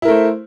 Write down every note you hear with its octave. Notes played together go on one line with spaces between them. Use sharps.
A3 E4 A#4 C5